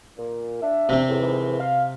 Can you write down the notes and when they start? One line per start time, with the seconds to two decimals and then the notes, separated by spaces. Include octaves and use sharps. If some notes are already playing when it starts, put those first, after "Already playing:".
0.17 A#2
0.61 D4 E5
0.89 C3 C4
1.08 E2 A2
1.20 G#2 D#3 E3
1.59 F5